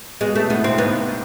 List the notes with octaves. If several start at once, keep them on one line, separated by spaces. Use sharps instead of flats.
B2 G#3
B2 A3
A2 B3
G2 C4
G#2 B3